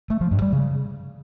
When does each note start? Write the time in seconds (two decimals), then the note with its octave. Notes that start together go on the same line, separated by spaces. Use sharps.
0.10 A3
0.21 F3
0.31 G2
0.42 G3
0.52 C#3